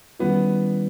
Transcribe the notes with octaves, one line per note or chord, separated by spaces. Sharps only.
D#3 G3 B3 C#4 E4